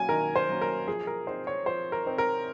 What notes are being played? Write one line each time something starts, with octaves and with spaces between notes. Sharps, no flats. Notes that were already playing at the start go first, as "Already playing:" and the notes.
Already playing: F#3 A#3 C#4 G#5
D#3 A#4
C5
F#3 A#3 C#4
A#4
F3 G#4
A#4
C4 D#4 C5
C#5
F3 C5
A#4
C4 D#4
A#4